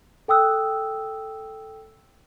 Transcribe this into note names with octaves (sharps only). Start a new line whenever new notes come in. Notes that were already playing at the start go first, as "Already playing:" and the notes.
A4 G5 D#6 E6 F#6